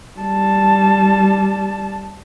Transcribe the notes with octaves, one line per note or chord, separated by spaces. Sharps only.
G3 A5